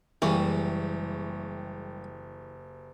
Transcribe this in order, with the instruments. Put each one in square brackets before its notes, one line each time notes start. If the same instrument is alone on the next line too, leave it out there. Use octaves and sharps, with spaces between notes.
[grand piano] F#1 G4 C#6 [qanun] E3 [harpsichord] G3 G#3 A#3